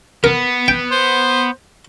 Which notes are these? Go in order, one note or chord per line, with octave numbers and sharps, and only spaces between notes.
B3 A#4
G5
C5